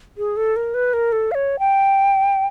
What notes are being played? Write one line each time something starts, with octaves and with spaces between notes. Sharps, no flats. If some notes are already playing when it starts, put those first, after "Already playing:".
G#4
A4
A#4
B4
A#4
A4
F5
C#5
G5